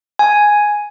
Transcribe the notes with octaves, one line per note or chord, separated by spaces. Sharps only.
G#5